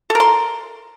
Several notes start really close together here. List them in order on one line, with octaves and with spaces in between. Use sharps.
A4 A#4 C6